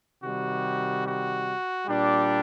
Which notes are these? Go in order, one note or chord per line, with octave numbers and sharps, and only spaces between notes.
C3 D#3 G3 F#4
F#4
A#2 G3 D4